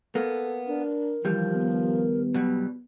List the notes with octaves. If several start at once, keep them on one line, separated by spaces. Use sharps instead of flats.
A#3 B3 A4
D4 A#4
D#2 E3 F3 G3
B3
B2 F#3 G3